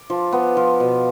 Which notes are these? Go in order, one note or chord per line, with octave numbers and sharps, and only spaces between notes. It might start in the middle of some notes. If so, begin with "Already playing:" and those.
Already playing: D6
F3
B3
F3
B2